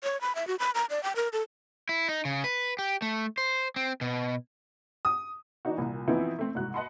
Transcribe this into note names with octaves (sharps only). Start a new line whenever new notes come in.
C#5
B5
E5
F#4
B5
A#5
D5
G5
A#4
A4
E4
D#4
C#3
B4
G4
A3
C5
C4
B2
D#6
E3 D4 D#4 F#4
C2 A#2
E3 F3 B3 C4 D#4 E4
A3 C4
C2 G#2 F#4 F#6
D#5 F#5 A5 B5 C6